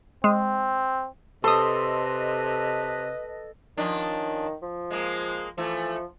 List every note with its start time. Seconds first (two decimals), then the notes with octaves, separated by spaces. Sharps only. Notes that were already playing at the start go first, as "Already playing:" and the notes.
0.24 G#3 C4
1.44 C3 A4 B4 D#5 C6 D#6
3.77 D#3 F3 C#4 D4
4.62 F3
4.90 G#3 A#3
5.58 E3 F3 A3